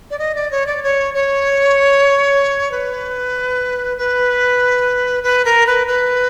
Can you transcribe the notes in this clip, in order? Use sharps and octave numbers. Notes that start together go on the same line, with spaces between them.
D5
D#5
D5
C#5
D5
C#5
C#5
B4
B4
B4
A#4
B4
B4